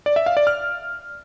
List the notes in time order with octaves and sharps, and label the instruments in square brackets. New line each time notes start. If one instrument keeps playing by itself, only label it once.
[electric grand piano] D5
E5
F5
D5
F6